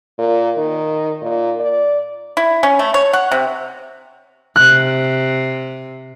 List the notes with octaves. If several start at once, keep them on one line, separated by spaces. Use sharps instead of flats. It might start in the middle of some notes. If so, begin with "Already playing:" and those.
A#2
D#3
A#2
D5
E4
C#4
A3
C#5
F#5
C3
C3 F#6